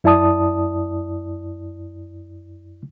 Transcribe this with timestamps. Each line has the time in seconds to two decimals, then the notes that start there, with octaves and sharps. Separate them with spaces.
0.04 F#2 E4 D5 A5 D#6